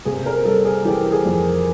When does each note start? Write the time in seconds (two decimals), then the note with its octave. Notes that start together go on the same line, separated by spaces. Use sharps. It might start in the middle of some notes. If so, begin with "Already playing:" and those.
0.05 C3 G#4
0.26 A#4
0.45 G3 A4
0.65 G#4
0.85 E3 G4
1.12 G#4
1.25 F2